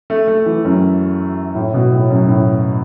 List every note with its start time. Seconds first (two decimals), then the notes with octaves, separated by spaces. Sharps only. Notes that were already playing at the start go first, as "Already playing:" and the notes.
0.10 A3
0.27 A3
0.46 E3
0.65 F#2
1.55 A2
1.74 B2
1.92 A2
2.10 F#2
2.28 A2